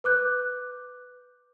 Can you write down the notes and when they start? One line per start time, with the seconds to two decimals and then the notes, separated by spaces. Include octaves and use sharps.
0.04 B4 D6 F#6 G6